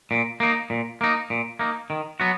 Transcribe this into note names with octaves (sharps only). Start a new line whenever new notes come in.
A#2
A#3 D#4
A#2
A#3 D#4
A#2
A#3 D#4
D#3
F#3 B3 F#4